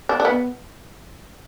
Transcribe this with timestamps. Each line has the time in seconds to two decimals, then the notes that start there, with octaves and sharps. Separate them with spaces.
0.09 D4
0.20 D4
0.25 B3